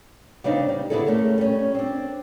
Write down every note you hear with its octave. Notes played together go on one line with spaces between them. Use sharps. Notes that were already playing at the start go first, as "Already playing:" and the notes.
C#3 B3 C4 D4 D#4
G3
D3 B3 C#4 E4 G#4 A4
A3 C#4 A#4
G3 C#4
C4 D4